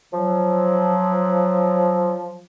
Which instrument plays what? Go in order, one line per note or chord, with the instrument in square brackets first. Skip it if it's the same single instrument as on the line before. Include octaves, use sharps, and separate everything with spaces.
[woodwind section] F3 F#3